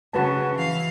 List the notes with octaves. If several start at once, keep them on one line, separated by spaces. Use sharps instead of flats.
C#3 F#4 B4 A5
E3 F5